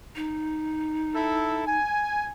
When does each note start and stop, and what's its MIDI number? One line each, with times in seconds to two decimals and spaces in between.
0.16 1.78 63
1.15 1.64 64
1.15 1.64 69
1.67 2.32 80